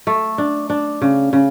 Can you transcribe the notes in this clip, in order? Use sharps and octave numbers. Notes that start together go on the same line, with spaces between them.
A3
D4
D4
C#3
C#3